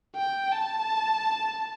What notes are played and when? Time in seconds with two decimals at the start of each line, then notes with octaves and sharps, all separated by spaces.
0.16 G5
0.52 A5